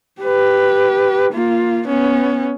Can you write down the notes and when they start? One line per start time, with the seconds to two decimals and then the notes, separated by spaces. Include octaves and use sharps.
0.21 G4 B4
1.33 A#3 F4
1.88 B3 C#4